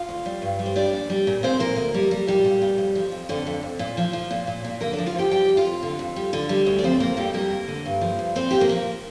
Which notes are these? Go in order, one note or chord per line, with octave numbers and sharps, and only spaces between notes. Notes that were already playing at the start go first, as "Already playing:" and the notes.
Already playing: F4 F5
D2
G3
G2
G3
C5
G3 D4 D5
A#2
G3
A#2
A#2 C4 C5
A#2 A#3 A#4
D2
G3
G3
A#2 G3 G4
A#2
A#2
F2
F3
F2
F2 D3 D4
F2
F2
A#2
F3
F3
A#2
A#2
A#2
D3 A#3 A#4
D4 D5
F3
F4 F5
F3 G4 G5
G3 G4 G5
F2
F4 F5
F2
D3
F2
G3
D3
G3
D2
D5
F3 C4 C5
F2 A#3 A#4
F2 G3 G4
G3 A#3 A#4
D2
D3
G2
F3
G2
A#2 C4 C5
A#2 G4
A#3 A#4
F3